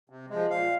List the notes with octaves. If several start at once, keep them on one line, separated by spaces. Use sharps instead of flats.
C3
F3 G#3
A#2 F5